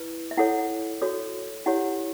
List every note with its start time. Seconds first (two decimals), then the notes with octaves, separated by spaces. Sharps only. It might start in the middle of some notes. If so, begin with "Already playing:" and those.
Already playing: E4 B4
0.31 E5
0.37 E4 A4 C#5 F#5
1.02 F#4 A4 C#5
1.66 E4 G4 C#5 F#5